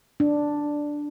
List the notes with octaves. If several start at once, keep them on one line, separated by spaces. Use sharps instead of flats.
D4